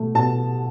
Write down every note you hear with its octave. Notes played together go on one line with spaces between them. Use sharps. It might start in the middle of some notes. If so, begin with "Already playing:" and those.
Already playing: B2 A3
B2 A5